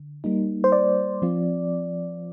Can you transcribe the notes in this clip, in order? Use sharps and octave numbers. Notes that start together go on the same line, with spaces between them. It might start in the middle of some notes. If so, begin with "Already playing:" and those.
Already playing: D3
G3 A#3 D#4
C5
D5
F3 C4 F4